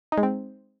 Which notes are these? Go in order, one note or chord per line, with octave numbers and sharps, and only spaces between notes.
D#4
G#3
C4